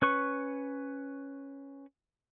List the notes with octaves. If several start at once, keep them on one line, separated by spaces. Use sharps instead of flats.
C#4 B4 C#6